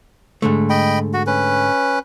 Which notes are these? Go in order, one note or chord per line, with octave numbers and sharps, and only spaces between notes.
G#2 D3 A3
D#5 G5 B5
F#4
C#4 B4